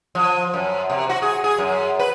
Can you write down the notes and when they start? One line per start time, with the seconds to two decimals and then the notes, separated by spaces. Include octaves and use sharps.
0.15 F3
0.54 F#2
0.90 C3
1.09 F#4
1.22 G#4
1.44 G#4
1.58 F#2
1.99 B4